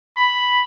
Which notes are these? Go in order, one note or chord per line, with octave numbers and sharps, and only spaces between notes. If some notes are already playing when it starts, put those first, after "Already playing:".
B5